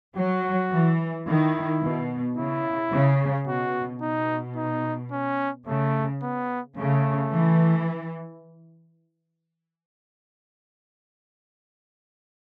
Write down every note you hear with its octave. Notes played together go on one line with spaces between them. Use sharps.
F#3 F#4
E3
D#3 E4
B2
C#3 E4
C#3
B2 F#4
B2 D#4
D#4
C#4
C#3 A3
B3
C#3 A3
E3